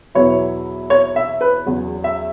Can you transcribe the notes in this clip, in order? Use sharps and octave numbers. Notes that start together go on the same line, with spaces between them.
E2 B2 F#3 B3 E4 C#5
C#5
E5
B4
E2 C#3 F#3
E5